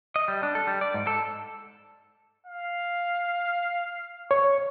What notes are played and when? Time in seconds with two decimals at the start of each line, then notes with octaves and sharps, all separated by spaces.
0.16 D#5
0.28 G3
0.43 D4
0.55 A4
0.67 G3
0.81 D5
0.94 G#2
1.07 A4
2.46 F5
4.31 C#5 C#6